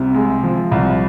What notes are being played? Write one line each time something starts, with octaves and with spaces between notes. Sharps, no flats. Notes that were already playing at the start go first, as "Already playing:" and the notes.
Already playing: C2 C3
G#3
F3
C2